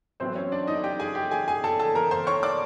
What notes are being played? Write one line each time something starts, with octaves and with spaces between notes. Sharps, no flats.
A1 A2 F#3 B3 C4 C5
C#4 C#5
D4 D5
D#4 D#5
G4 G5
G#4 G#5
G4 G5
G#4 G#5
G#4 G#5
A4 A5
A4 A5
A#4 A#5
C5 C6
C#5 C#6
D5 D6